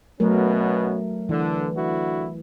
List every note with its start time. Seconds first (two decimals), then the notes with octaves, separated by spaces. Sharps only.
0.20 B2 F#3 A3 B3 C#4 A#4
1.29 D3 E3
1.75 D3 E4 F#4